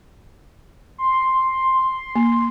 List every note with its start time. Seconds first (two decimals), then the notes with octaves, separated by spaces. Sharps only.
0.98 C6
2.15 A#3